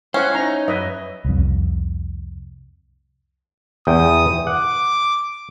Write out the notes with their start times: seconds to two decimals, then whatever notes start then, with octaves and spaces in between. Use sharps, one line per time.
0.14 C#4 E4 C5 C#5 E5 F#5
0.35 D#4 A#5
0.68 F#2 B4 D#5 E5
1.25 C2 F2
3.87 E2 G5 D#6
4.47 F#5 D6